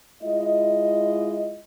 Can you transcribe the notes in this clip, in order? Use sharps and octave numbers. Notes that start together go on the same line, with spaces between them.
G#3 E4 F4 D#5